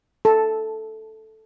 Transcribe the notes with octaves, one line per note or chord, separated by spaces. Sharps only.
A4